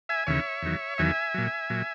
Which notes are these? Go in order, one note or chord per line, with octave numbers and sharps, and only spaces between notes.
E5 G#5
D#2 C#3 E3 C#5 E5
E2 D#3 F#3
E2 D#3 F#3 E5 G#5
A#2 F#3
A#2 F#3